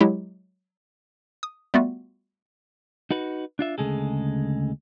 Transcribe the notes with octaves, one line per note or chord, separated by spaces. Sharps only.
F#3 G#3 E4 G4
D#6
G3 A3 B3 F4 F#4
D#4 F#4 B4
D4 F4 E5
D2 C#3 G#3 G#4 A4